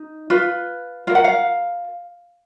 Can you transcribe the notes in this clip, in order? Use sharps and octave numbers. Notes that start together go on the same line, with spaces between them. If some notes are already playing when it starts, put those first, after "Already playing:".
Already playing: D#4
F4 B4
F4 A#4 F5
F#5
F5